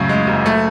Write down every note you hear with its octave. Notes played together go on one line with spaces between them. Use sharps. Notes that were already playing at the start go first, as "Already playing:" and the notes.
Already playing: F#2 A2 C#3
G#3
F#1
A3